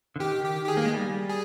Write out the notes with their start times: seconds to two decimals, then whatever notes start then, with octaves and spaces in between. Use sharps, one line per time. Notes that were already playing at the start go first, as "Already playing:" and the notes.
0.16 D3
0.20 D#3 G4
0.45 G4
0.65 G4
0.68 G#4
0.77 A#3
0.85 G#3
0.94 G3
1.29 G#4